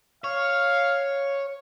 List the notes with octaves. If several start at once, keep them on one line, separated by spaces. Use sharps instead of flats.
C#5 F5